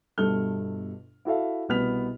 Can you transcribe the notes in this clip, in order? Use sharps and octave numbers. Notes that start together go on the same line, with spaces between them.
G1 G2 B2 A4 F6 G7
E4 F#4 A4 E5 F5
C2 B2 B3 F6 B6 F7